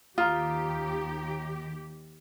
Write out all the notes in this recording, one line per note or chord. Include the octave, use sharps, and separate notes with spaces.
D#2 F4 G4 A#5 D#6